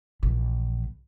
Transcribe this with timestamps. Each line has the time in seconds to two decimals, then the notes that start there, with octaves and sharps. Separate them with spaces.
0.23 A#1 E3